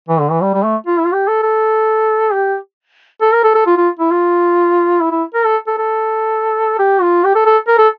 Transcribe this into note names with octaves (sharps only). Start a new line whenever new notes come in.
E3
D3
E3
G3
G3
A3
F4
E4
F4
G4
A4
A4
G4
A4
A#4
A4
A4
F4
F4
E4
F4
E4
E4
A#4
A4
A4
A4
G4
F4
G4
A4
A4
A#4
A4